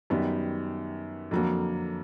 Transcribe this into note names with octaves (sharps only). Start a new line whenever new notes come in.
F#2 D#3 G3 B3
F2 D3 F#3 A#3